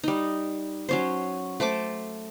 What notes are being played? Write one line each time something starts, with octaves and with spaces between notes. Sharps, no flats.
G3 D#4
F#3 C#4 C5
A3 C5 A5 D6